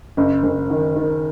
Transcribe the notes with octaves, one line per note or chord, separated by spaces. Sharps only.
F#1
F#1
D#3
D#3